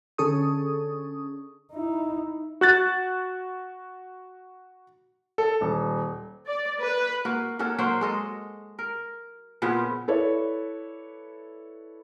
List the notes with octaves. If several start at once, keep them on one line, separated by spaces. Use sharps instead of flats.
D3 C#4 G#4 A4 C#6 D#6
D#4 E4
F#4 F#6 A6
A4
D#1
D5
B4
A#3 F#4
A#3 C#4 F#4 A4
F#3 A#3 F#4 C5
G#3 A4 D#5
A#4
A#2 C#3 F3 B3
E4 A4 B4 C#5 D5 E5